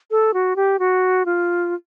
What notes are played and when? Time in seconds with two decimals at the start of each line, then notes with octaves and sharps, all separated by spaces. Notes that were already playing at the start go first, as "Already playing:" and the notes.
0.11 A4
0.34 F#4
0.56 G4
0.79 F#4
1.25 F4